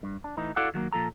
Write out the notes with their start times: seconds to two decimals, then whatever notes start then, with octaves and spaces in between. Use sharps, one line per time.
0.03 G2
0.24 D4
0.37 A2 E3 D#4
0.56 E4 F#4 A4 D5 F5 F#5
0.74 D#3 F#3 A3 A#3
0.92 A#2 F3 A4 A#5